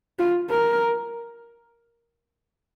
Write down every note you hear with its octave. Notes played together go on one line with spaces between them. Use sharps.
F4
A#4